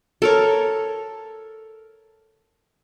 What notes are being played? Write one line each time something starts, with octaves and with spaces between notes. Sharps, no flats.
A4 A#4 C#5